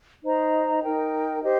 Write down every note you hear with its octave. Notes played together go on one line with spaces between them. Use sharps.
D#4 C5 D#5 A#5
D#4 A#4 G5
G4 C5 D#5